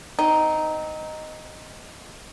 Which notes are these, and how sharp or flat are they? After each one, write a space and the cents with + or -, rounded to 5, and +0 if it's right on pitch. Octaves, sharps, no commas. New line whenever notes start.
C4 -25 D#4 +0